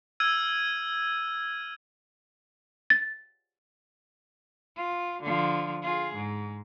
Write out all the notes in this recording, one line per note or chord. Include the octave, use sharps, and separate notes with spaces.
E6 F6 G#6 D#7
A6
F4
D3 F3
F4 G#4
G#2